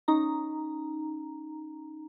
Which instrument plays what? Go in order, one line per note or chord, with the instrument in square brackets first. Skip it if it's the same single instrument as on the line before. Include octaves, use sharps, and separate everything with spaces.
[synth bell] C#4 D#4 A#5